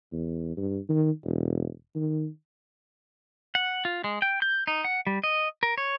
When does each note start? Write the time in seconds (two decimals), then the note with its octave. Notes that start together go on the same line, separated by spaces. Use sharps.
0.12 E2
0.57 G2
0.89 D#3
1.24 E1
1.95 D#3
3.55 F#5
3.85 F4
4.04 G#3
4.22 G5
4.42 G6
4.67 D#4
4.85 F#5
5.07 G3
5.24 D#5
5.63 A#4
5.78 C#5